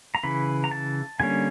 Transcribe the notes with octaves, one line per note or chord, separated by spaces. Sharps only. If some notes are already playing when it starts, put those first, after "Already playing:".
A#5
C#3 E3 B5
A#5
A5
D3 G3 A#3 C#4 G#5